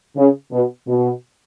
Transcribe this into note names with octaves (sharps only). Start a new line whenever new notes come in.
C#3
B2
B2